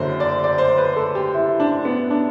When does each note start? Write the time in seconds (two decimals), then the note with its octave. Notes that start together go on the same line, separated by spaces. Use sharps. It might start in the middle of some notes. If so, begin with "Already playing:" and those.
Already playing: F#1 F#2 D3 C5
0.20 D5
0.44 D5
0.58 C5
0.78 B4
0.96 A4
1.15 G4
1.34 E4
1.60 D4
1.85 B3
2.10 D4